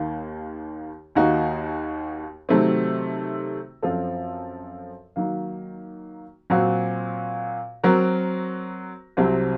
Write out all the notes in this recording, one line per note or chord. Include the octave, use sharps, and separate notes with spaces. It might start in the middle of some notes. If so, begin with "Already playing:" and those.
Already playing: D#2 D#3 A#3
D#2 D#3 A#3 D#4 F#4
C3 D#3 F#3 A3 C4
F#2 F3 C4 F4 A4
D#3 F#3 A#3
A#2 F#3 C4 F#4
F#3 C4 F#4 A#4
C2 C3 F#3 C4